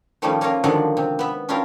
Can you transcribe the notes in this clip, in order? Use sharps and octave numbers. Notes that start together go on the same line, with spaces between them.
D#3 F3 G3 A3 C#4 D#4
A#3 C#4 D#4 F4 A#4
D3 D#3 F3 F#3 G#3 D4
C3
B3 E5
C#4 D4 E4 F4 G4 A#4